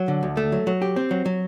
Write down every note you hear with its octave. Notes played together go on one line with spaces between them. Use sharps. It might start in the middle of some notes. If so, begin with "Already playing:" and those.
Already playing: F#3
D3
D2
A3
F#3
F#3
G4
C4
F#3
F#3